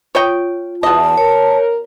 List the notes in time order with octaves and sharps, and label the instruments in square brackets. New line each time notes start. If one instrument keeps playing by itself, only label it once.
[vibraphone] F4 [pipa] C#5 D#5 G5
[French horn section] E2 [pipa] B2 D#5 [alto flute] A5
[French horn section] A#4 [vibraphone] C#5